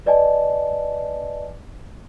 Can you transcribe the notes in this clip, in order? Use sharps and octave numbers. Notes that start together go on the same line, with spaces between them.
B4 D5 D#5 G#5 A5